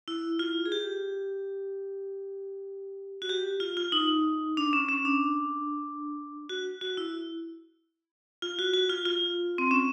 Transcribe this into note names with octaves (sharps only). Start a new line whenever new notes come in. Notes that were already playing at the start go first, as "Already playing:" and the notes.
E4
F4
G#4
G4
F#4
G4
F4
F4
D#4
D4
C#4
C#4
D4
F#4
F#4
E4
F4
F#4
F#4
F4
F4
C4
C#4